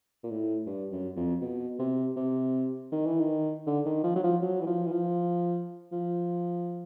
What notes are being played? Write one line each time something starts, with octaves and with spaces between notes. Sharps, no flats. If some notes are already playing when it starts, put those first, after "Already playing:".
A#2
A2
G2
F#2
F2
B2
C3
C3
D#3
E3
D#3
D3
D#3
F3
F#3
F3
F#3
E3
F3
E3
F3
F3